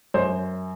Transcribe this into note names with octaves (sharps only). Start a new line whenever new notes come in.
F#2 C5